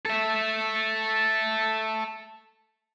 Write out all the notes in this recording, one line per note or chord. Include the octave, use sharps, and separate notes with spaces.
A4 E5